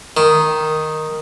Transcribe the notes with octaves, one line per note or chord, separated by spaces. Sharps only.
D#3